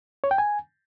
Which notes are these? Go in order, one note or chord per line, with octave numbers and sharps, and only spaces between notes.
C#5
G5
G#5